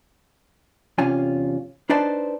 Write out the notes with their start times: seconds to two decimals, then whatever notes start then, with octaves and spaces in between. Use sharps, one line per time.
0.98 E2 C3 C#4 F4 G#5
1.90 D4 D#4 B4 C5 D5 A5